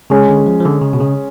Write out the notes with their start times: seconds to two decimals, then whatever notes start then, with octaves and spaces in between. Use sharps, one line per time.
0.10 C#3 G#3 C#4 G#4
0.29 D3
0.46 F3
0.60 F3
0.65 D3
0.82 C#3
0.93 B2
1.00 C#3